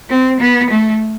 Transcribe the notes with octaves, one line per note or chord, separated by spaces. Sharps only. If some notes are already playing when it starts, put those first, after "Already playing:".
C4
B3
A3